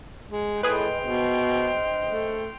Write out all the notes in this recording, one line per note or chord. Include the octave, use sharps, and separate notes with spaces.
G#3
A2 G#4 B4 D#5 G5 C6 F6
B2 D4 C5 D#5
A3